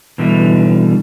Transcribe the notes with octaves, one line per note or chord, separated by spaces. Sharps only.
B2 D3 E3 G3